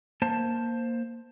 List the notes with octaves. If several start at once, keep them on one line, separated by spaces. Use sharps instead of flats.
A#3 C5 A5